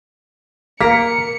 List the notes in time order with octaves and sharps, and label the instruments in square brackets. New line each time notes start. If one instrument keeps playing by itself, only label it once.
[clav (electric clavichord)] A#3 [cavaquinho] A#4 [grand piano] B6 [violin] C#7